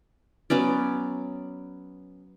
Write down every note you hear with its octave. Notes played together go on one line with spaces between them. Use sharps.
F#3 B3 C#4 D5